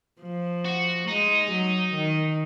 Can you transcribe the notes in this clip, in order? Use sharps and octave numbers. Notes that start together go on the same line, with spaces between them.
F3
F#4
G#3 D#4
F#3
D#3